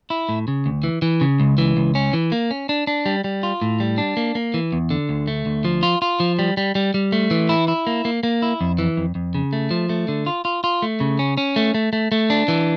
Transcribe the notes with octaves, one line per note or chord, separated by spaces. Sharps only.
E4
A2
C#3
D2
E3
E3
C#3
C#2
E3
C#2
C#4
E3
A#3
C#4
D4
D4
G3
G3
F4
A2
G3
D4
A#3
A#3
E3
E2
D3
D2
A3
D2
F3
F4
F4
F3
G3
G3
G3
G3
A3
E3
E4
E4
A#3
A#3
A#3
E4
F2
E3
F2
F2
C#3
A3
F3
A3
D3
F4
F4
F4
A3
C#3
C#4
C#4
A3
A3
A3
A3
D4
E3